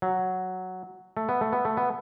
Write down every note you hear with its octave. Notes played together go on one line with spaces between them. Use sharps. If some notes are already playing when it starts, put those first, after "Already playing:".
F#3
A3
B3
A3
B3
A3
B3